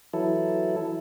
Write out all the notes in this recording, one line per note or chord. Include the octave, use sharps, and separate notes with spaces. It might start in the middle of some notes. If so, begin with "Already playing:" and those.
E3 F#3 E4 A4